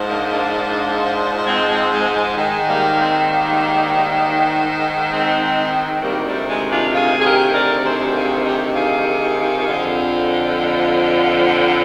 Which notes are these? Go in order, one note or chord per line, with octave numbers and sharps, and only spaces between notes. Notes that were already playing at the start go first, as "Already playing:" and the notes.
Already playing: G#2 F3
A#3 D4
A#3 D4
A#3 D4
G#3 C4
G#3 C4
G#3
G#3
G#2 D#3 G#3
G3 A#3
A#3
G#3 C4
G3 A#3
G#3 C4
D2 C3 D#3 G3 A#3
G3
G#3
D4 F4
F4 G#4
G#4
G4 A#4
A#4 D5
G#4 C5
F4 G#4
D#4 G4
F4 G#4
F2 D3 F3